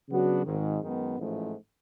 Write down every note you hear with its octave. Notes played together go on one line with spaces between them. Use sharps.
C#3 F#3 B3 D4 F#4
G#1 G#2 D#3
F#2 D#3 G#3 B3
A1 G#2 F3 A3